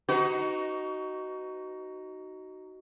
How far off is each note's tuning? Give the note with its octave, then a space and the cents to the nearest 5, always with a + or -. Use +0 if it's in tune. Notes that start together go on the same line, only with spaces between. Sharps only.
D#4 +0 F#4 +20 B4 +40